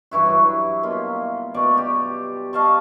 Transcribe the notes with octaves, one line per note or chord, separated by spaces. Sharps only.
G2 E3 E4 F#4
F#3
B2 A#3 F4
B2 D5 C#6
G4
D#5 F5 A5 C#6